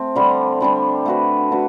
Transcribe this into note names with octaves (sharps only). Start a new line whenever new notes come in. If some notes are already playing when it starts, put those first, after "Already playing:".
Already playing: A3 C4
D3 G3 D4
D3 G3 D4
A3 D4 F#4 B4
A3 D4 F#4 B4